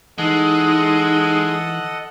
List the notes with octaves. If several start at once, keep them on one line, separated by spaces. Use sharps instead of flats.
E3 G#3 D#4 A4 D#5 F#5